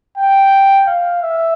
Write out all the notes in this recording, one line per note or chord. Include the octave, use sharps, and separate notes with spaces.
G5
F5
E5